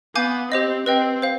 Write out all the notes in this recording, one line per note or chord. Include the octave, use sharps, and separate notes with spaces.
B3 F5 G#5 D6 G6
C4 G4 C5 D#5
C4 B4 D#5 G5
C5 F5